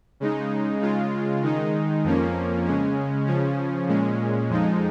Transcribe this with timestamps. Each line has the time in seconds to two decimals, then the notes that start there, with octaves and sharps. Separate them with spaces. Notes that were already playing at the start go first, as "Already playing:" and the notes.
0.20 C#3 G#3 D#4
0.81 C#3 G#3 F4
1.43 D#3 G#3 D#4
2.04 F2 F3 A#3 C#4
2.66 C#3 G#3 C#4
3.26 C#3 F3 C#4
3.88 A#2 G#3 C#4
4.49 F2 F3 G#3 D#4